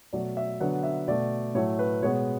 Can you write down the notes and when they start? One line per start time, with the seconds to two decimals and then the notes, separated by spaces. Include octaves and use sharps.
0.13 B2 F#3 A3 D5
0.37 E5
0.60 D3 F#3 B3 F#5
0.83 E5
1.08 B2 A3 D5
1.55 A2 F#3 A3 C#5
1.79 B4
2.02 B2 G#3 B3 C#5